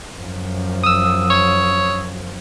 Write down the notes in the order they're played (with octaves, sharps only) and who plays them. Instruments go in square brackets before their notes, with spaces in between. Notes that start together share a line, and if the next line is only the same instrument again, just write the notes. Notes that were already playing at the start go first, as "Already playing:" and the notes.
[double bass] F#2 F3
[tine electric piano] D#6 E6
[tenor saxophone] C#5